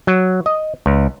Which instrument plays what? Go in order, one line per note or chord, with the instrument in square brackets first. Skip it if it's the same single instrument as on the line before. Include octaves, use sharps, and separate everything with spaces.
[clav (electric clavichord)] F#3
D#5
C#2